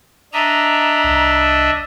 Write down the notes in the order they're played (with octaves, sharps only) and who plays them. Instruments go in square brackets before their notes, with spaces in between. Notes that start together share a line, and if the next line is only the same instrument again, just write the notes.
[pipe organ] D4 D#5 E5 [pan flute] A#5
[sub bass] C2